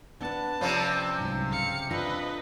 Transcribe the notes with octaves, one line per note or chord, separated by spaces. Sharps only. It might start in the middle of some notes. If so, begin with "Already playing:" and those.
B3 D4 B4 F#5 A5
C3 F3 C#4 C#5 D5 B5
C2 G#2 F#3
C#3 F5 C#7
D4 F4 A4 B4 D#5 A#6